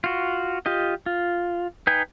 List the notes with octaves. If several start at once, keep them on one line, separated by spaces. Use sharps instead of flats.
F4 F#4
F4 G4 D#5
F4
D#4 B4 G5 G#5